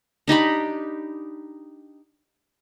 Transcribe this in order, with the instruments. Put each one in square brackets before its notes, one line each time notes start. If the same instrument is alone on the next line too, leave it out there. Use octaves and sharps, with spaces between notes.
[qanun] D4 D#4 G4 B5